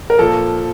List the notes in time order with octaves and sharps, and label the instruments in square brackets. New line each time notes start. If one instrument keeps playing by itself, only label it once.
[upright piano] A#4
A#2 F3 A4